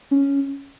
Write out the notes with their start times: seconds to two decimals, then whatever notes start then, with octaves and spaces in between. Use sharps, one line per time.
0.11 C#4